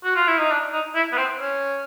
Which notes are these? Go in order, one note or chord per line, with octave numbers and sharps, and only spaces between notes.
F#4
F4
E4
D#4
D4
D#4
E4
B3
C4
C#4